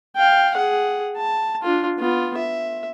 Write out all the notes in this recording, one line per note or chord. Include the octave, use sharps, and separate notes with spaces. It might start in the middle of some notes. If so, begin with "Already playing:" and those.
F5 G5
G#4 F#5
A5
D4 F4
B3 F4
E5